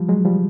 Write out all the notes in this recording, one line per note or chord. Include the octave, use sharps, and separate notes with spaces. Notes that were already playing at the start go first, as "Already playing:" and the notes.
Already playing: F3 G3
F#3 G#3
F3 G3